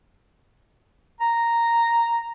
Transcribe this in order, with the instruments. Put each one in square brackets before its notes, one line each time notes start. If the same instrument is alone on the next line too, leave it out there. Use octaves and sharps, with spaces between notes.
[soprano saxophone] A#5